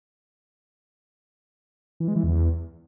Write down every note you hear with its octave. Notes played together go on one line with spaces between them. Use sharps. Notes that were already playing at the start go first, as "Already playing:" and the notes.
E3
G#3
E3
E2